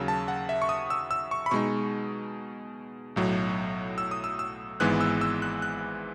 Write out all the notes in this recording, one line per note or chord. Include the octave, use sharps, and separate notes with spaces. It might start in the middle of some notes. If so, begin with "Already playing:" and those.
Already playing: D#2 C#3 F#3 E6
A5
F#5
E5
C#6
D#6
E6
E6
C#6
B5
B2 G#3 D#4 C#6
B1 A2 F#3
E6
D#6
E6
E6
G#1 G#2 E3 G#3 B3 F#6
E6
E6
F#6
F#6